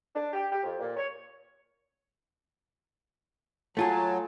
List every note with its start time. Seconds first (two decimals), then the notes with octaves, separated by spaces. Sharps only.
0.14 D4
0.33 G4
0.51 G4
0.63 F2
0.79 A#2
0.96 C#5
3.77 F#3 A3 F4 G#4 A5